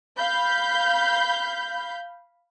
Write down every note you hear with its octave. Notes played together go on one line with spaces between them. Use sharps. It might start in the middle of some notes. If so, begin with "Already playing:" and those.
F5 B5 G6